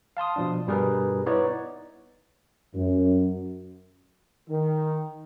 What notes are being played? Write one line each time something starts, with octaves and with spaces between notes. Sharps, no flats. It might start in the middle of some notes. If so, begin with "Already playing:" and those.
F5 A5 C6 D#6
B2 F3 D4
G2 B2 G3 G#4 A#4 B4
B3 D#4 E4 B4 C#5 D5
F#2
D#3